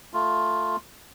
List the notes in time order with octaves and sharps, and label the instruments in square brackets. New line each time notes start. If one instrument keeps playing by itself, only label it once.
[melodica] A3 F4